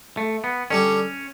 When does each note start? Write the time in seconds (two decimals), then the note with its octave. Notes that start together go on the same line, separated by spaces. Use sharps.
0.17 A3
0.44 B3
0.70 D3 G3 C#4 D4